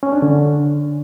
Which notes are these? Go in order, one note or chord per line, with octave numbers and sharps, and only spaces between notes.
C#4
D4
D3